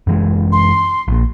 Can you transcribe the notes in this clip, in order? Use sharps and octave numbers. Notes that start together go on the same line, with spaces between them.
F#2 E3 G#3
C6
A#1 A#2